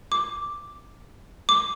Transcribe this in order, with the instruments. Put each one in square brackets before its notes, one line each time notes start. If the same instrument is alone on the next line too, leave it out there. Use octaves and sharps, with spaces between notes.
[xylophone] D6
D6